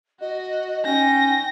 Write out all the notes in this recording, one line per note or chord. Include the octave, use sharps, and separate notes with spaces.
F#4 D#5
C#4 D#4 G5 A#6